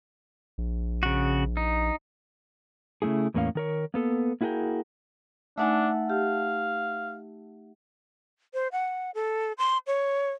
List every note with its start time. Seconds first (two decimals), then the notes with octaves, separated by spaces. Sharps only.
0.58 A#1
1.03 C#3 F#4
1.57 D#4
3.02 C#3 E3 A3 E4 G#4
3.34 E2 A2 A#3 C#4 F5
3.55 D#3 A#4 C#5
3.94 A#3 B3 A4
4.41 A#3 E4 F#4 G#4 A#4 G5
5.58 A3 D4 D#4 E5 F#5 G#5 A5
6.10 G4 F5
8.54 C5
8.72 F#5
9.15 A4
9.58 C6
9.87 C#5